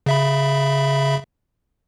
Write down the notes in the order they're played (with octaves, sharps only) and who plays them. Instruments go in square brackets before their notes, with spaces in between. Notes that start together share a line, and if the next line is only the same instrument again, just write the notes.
[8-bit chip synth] C#3 E5 B5